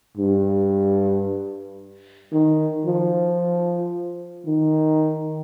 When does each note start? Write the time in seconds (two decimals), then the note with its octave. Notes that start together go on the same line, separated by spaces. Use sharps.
0.17 G2
2.32 D#3
2.86 F3
4.46 D#3